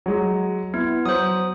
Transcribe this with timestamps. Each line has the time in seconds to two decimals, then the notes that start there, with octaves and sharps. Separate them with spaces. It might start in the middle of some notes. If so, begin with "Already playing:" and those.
0.06 F#3 G#3
0.74 B3 E4
1.06 F#3 C5 D#6